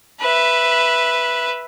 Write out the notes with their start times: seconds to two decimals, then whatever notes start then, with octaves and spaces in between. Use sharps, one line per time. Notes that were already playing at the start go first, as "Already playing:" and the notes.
0.21 B4 E5